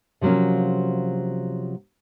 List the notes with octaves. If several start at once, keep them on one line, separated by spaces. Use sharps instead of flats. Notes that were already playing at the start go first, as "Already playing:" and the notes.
C3 F3 F#3 A#3 C#4